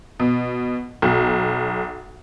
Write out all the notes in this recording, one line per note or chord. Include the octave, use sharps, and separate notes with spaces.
B2
B1